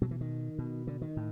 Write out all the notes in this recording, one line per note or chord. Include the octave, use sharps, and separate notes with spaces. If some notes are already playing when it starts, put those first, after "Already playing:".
B2 F#3
E3
D#3
B2
D3
D#3
A2